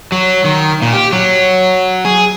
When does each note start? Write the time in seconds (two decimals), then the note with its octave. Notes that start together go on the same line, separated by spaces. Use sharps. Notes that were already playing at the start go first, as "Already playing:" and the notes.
0.12 F#3
0.44 D#3
0.82 A#2
0.93 G4
1.13 F#3
2.05 G#4